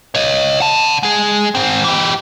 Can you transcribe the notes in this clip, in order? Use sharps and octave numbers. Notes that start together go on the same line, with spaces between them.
C#5 D#5
F#5 A5
G#3 G#4
G#2 C4
E3 G4